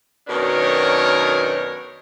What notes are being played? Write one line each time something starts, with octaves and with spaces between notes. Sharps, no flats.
F#2 B2 D#3 D4 A#4 C#5